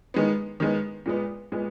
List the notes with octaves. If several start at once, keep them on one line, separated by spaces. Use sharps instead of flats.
D#3 G#3 B3
D#3 G#3 B3
A#2 G#3 B3
A#2 G#3 B3